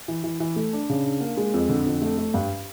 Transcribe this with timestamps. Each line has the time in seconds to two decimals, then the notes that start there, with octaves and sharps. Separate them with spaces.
0.08 E3
0.24 E3
0.40 E3
0.56 A3
0.73 D4
0.89 C#3
1.05 D4
1.21 A#3
1.37 G#3
1.54 F2
1.69 D3
1.86 F2
2.02 A3
2.18 A3
2.34 G2